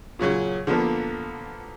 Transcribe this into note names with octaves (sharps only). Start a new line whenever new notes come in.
A#2 C#3 F#3 C#4
D3 F3 A#3 B3